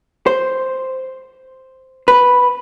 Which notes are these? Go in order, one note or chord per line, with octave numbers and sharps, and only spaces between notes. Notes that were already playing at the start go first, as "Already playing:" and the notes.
C5
B4